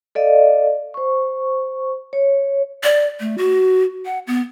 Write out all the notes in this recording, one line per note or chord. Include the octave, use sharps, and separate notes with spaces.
A4 D5 D#5 F5
C5 C#6
C#5
D5
A3
F#4
F#5
B3